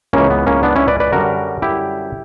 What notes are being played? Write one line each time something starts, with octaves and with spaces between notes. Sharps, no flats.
C#2 C#3 E3 A#3 C#4
B3
A#3 C#4
B3 D4
C#4 E4
B4 D5
B4 D5
F#2 D3 G3 F#4 A#4
E4 G4